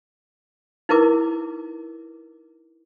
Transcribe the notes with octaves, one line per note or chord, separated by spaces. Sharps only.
D#4 E4 A#4 B4 D6